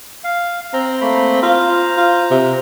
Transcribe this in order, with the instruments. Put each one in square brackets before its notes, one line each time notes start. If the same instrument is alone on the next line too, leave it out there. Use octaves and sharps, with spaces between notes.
[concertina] F5
[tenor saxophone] C4 [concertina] A#5
[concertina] A3 A#3 B5
[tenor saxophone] F4 [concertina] C5 A#5
[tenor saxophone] F4
C3